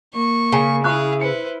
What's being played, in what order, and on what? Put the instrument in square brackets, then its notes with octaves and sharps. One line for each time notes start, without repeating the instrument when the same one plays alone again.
[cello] A#3 [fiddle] C#6
[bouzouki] C#3 [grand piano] G#5
[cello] E4 [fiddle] G#4 F5 [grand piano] C#6 F6 F#6
[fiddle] B4 C5 [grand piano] C#7